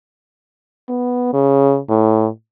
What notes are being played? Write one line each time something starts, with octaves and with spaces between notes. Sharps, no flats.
B3
C#3
A2